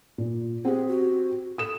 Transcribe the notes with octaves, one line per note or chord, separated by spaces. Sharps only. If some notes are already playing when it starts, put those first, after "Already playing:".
A#2
C4 G4 G#4
F#4
A4 D#6 E7